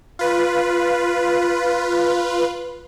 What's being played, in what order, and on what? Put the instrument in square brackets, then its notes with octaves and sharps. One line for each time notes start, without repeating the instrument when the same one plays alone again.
[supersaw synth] F4 B4